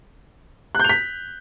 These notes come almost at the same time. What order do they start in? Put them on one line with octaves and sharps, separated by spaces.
F#6 G6 F7 B6